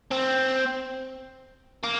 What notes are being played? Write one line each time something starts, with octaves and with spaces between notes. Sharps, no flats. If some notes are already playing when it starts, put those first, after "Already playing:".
C4
A#3